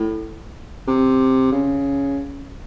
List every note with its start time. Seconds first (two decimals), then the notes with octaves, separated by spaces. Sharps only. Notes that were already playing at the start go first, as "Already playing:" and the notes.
Already playing: A2
0.88 C3
1.52 C#3